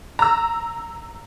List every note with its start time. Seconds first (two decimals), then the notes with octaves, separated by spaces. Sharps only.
0.19 A#5 E6